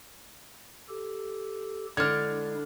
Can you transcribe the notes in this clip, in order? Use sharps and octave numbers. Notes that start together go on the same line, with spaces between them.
G4 A4
D3 G#3 D4 E4 F6 G#6